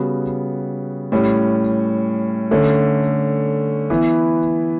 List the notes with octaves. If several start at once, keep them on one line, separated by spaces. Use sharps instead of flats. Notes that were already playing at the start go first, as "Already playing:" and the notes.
Already playing: C#3 G3 B3 F#4
A2 G3 C#4
D3 A3 C#4
E3 B3 E4